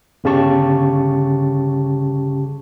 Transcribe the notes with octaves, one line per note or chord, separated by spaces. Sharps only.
G1 C#3 G4 A5 C#6